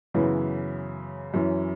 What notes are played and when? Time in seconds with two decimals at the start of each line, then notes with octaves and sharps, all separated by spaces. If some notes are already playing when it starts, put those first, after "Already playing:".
0.14 F#2 C#3 E3 B3 E4
1.34 F#2 E3 C#4 E4